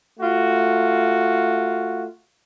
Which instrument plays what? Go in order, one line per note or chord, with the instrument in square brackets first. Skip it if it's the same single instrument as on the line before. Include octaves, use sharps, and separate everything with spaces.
[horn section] A3 F4 F#4